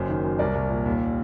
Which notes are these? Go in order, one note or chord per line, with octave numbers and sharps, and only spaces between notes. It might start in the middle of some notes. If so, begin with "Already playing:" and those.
Already playing: F#1 F#2 C5
D#3
F#2
C2 A#4 D5
C2
A#2
D#2